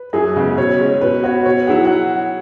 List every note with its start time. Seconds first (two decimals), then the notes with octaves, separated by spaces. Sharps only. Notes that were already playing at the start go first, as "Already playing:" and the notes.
Already playing: B4
0.13 F#2 G#4
0.36 C#3 G#3 B3
0.57 B2 C#5
0.80 G#3 C#4
1.01 B2 B4
1.23 B3 F#4 C#5
1.45 B2 C#5
1.67 F#3 E4 G#4 F#5
1.85 F#5